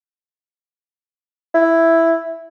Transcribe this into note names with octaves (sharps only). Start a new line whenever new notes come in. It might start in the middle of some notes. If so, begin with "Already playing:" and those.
E4